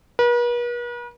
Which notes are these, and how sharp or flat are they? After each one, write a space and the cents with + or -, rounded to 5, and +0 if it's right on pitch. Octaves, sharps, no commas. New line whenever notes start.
B4 -45